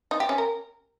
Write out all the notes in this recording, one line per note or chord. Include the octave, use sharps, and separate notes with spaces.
D#4
G4
C#4
A#4